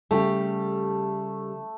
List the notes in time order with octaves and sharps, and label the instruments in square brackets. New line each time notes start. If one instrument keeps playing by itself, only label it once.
[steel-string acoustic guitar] C#3 G3 G4 [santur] A3